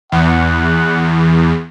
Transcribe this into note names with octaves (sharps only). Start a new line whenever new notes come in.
E2 F#5